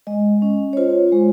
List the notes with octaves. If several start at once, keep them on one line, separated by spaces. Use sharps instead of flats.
G#3 D#5
C#4
C#5
F4 C5
G#3